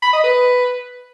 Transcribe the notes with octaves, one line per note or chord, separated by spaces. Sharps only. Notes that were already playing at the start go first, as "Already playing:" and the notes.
B5
D#5
B4